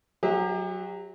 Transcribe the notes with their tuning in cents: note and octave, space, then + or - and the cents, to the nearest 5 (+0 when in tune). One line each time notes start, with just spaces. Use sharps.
F#3 +0 G4 +40 E5 -35